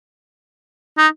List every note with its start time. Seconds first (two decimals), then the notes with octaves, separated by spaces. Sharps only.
0.98 D#4